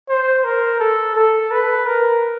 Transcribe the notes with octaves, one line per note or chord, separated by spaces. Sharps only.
C5
A#4
A4
A4
B4
A#4